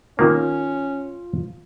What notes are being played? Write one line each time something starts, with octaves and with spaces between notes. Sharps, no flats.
D#3 A#3 C#4 F4